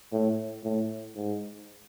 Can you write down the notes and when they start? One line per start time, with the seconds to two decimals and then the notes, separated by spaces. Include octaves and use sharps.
0.12 A2
0.64 A2
1.16 G#2